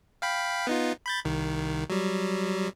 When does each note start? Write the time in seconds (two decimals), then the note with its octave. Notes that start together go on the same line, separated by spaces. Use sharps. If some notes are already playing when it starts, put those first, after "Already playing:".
0.22 F5 G5 B5
0.67 B3 D#4 F4
1.06 B5 G6 A6
1.25 C2 D#3
1.90 F#3 G3